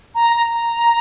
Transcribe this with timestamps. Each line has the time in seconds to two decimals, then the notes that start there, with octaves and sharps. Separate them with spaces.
0.15 A#5
0.36 A#5